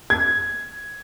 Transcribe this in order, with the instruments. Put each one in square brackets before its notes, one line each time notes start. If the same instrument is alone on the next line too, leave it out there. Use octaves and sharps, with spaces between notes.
[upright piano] G#6